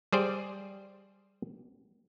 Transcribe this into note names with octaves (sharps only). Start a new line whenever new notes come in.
G3 G#4 C5 D5